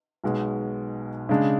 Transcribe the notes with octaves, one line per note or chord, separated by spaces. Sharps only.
B1 B2 G#3
C#3 G#3 D4